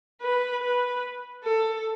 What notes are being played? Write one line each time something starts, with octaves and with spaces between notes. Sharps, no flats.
B4
B4
A4